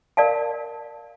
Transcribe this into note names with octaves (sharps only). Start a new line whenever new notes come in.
A#4 D5 F5 A5